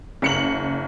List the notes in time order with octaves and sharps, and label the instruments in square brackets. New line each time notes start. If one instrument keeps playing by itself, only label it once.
[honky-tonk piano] F#1 C#7 F#7